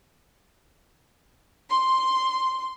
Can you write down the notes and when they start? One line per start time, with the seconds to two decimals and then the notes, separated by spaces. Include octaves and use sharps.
1.70 C6